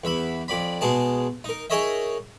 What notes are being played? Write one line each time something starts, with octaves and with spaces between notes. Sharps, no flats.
E2 E5 B5
F2 D5 B5
B2 G#3 G#4 A5
D#4 A#4
D#4 G#4 A#4 C#5 D#5 E5